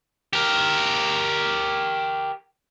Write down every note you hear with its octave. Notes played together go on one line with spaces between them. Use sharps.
G4 A#4